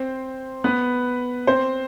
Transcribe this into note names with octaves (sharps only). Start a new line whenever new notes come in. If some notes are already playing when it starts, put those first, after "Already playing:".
Already playing: C4 C5
B3 B4
C4 C5